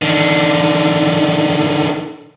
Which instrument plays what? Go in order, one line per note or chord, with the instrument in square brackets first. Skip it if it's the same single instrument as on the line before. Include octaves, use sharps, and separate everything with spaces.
[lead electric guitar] D3 D#3